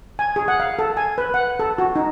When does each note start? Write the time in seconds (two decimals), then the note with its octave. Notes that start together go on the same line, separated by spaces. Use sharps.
0.19 G#5
0.36 G#4
0.48 F#5
0.60 F5
0.79 A4
0.97 G#5
1.18 B4
1.34 F#5
1.59 A4
1.78 F#4
1.96 D#4